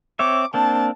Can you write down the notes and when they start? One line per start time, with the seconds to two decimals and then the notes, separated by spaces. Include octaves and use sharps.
0.19 C4 C#5 E5 D6
0.54 A#3 C4 D4 A5